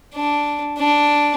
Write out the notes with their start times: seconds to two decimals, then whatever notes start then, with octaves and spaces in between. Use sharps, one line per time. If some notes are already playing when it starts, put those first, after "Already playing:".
0.15 D4
0.78 D4